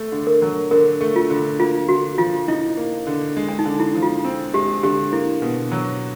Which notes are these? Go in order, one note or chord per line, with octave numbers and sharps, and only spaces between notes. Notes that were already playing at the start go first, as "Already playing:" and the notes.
Already playing: A3
D3
A#4
F#3
D3 A#4
A3
F4
D3
A#3 F4
D3 F#4
F3 F4
D#4 E4
A#3
D3
G#3
D4
D#4
D3
E4
F3
F4
C4
G#3 G4
D3 G4
A#3 E4
B2
F#3